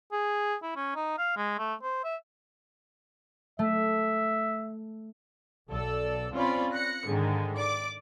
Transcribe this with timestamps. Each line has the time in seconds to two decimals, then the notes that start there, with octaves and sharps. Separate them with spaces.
0.12 G#4
0.63 E4
0.76 C#4
0.95 D#4
1.18 F5
1.37 G#3
1.58 A3
1.83 C5
2.04 E5
3.59 A3 E5
5.70 B1 A4 D5 E6
6.33 C4 C#4 F4 D5 B5
6.73 F#6 A#6 C#7
7.07 G#2 D3 D#3 G#3
7.56 D5 D6